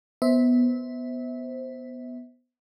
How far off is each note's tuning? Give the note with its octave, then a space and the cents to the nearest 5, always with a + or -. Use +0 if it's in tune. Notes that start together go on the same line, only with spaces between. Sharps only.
B3 +0 C5 +0 E5 -25